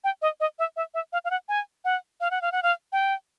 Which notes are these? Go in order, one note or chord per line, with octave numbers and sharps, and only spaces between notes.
G5
D#5
D#5
E5
E5
E5
F5
F5
F#5
G#5
F#5
F5
F#5
F5
F#5
F5
G5